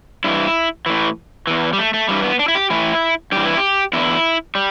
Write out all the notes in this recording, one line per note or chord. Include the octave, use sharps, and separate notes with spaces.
G2 E3 E4
A2 E3
E2 E3
G3
A3
A3
G2 E3 G3
B3
D4
E4
G4
A2 E3 E4
G2 E3 G4
E4
G4
E2 D3 E4
G3